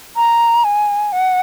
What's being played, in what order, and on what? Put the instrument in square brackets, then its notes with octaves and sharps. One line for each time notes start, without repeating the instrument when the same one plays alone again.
[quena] A#5
G#5
F#5